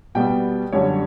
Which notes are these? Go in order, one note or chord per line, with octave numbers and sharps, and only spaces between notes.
B2 G3 B3 G5
F#2 D3 G3 C#5